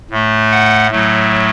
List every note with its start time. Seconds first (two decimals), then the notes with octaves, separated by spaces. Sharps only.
0.11 A2 A3
0.51 F#5
0.91 A2 F#3 A3